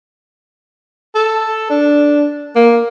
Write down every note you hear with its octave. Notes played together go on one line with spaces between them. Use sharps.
A4
D4
A#3